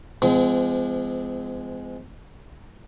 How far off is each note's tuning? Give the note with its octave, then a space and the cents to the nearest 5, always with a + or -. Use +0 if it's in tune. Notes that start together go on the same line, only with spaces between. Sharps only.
F3 -30 G#3 +0 C4 -45